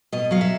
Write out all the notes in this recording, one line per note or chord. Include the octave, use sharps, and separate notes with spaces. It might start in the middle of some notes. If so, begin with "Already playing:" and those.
B2 D#5
F#3 F5
E5